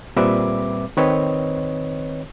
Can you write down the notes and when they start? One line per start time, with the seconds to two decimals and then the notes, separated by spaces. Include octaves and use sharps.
0.16 A#2 G3 C4 B4 E5 D6
0.97 D#3 C4 B4 C#5 D#5